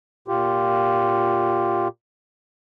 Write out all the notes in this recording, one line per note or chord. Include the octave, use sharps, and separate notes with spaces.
A#2 F4 G4